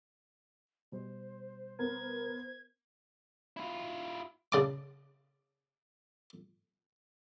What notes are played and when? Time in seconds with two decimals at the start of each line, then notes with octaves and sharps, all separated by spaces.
0.92 B2 G3 C5
1.79 B3 A#4 G#6
3.57 E4 F4
4.52 C#3 A5 D6